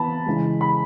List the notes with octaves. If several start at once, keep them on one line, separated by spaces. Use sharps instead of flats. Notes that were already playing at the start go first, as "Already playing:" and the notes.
Already playing: E3 B3 A5 B5
C#3 E3 G#3
B5